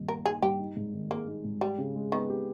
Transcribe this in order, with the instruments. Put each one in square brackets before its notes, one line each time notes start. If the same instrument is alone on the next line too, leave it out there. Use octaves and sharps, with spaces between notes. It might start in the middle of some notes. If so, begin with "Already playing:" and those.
Already playing: [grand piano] G2 A#2 D#3 D#4
[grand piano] A#3 [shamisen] A#4
[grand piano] D#4 [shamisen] G#4
[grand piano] G2 [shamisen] G4
[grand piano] D#4
G#2
D#3
[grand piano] G#3 [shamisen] A#3
[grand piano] D#4
G#2
[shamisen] G3 [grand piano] G4
[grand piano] C#3
G#3
[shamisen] D#3 [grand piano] B3
[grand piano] G4